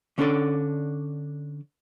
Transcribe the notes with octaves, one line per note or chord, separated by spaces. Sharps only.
D3 C#4 D4 A4 D5